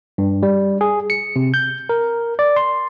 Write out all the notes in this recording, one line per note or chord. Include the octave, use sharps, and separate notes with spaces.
G2
G3
G#4
C#7
C3
G6
A#4
D5
C6